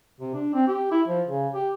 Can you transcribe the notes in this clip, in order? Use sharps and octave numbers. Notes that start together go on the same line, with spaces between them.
C3
D4
C4
G4
E4
F3
C#3
G4